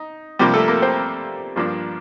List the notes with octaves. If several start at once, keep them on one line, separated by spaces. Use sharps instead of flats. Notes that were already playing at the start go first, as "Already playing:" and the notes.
Already playing: D#4
C3 F3 G3 A#3 D4 G4
A3 A4
A#3 A#4
C4 C5
G2 F3 A#3 D4